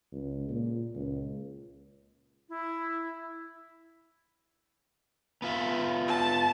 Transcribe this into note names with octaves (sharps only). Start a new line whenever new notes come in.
C#2
A#2
C#2
E4
B3 F4 E5
A5